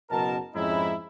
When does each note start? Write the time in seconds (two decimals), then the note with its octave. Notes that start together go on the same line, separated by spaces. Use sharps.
0.10 F#1 B2 A#4 A5
0.54 F2 G#2 G#3 C#4 D#4 E4